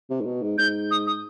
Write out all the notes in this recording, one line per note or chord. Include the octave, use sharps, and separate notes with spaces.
C3
G#2
B2
G#2
G#2 G6
D#6
D#6